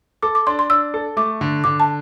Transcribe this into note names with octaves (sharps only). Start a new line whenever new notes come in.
A4 D6
D6
D4 C6
C6
D4 E6
A4
A3 D6
D3
D3 D6
A5